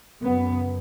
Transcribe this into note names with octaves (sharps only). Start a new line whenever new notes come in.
F#2 C#3 B3